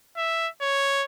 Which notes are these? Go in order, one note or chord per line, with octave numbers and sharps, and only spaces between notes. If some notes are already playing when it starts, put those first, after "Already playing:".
E5
C#5